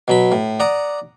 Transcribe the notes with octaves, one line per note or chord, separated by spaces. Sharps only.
B2 F#3 B5
A2
D5 F#5 A#5 D6 D#6